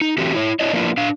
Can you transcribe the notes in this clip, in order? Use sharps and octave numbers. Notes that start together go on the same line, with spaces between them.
D#4
E3 A3 C4 F#4 G4
E4 C#5
D4 E4 C#5 D#5
F3 A#3 B3 D4 E4 F4
D4 F5